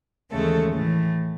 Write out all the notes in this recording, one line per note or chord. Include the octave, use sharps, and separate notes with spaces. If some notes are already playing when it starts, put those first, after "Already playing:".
D#2 C#3 E3 G#3 A3 A4
A2 E3 A3